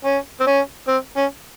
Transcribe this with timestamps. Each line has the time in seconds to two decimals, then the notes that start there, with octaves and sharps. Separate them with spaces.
0.05 C#4
0.40 C4
0.47 C#4
0.88 C4
1.16 C#4